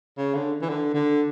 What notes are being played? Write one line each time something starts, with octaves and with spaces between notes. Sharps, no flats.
C#3
D3
E3
D3
D3